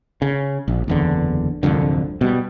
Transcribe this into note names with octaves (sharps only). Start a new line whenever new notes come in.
C#3
A#1
F#1 E2 D3
D1 C2 F2 D3
B2 G3